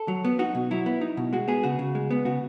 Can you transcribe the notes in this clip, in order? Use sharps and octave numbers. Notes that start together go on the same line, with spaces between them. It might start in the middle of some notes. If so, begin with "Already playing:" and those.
Already playing: A4
F#3
B3
D#4 F#4
B2
F#3 E4
B3
D#4
B2
G#3 F#4
B3 G#4
C#3 F#4
C#3
G#3
B3
C#3 F#4